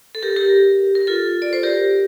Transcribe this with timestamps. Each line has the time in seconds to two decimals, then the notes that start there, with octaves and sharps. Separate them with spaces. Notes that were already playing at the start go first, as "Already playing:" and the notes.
0.15 A4
0.23 G4 A#4
0.36 G4 A#4
0.95 A#4
1.07 F4 A4
1.42 D5
1.53 C5
1.63 G4 A#4